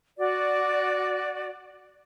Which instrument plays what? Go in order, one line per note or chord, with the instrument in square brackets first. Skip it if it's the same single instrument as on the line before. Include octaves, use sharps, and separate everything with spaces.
[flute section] F#4 D5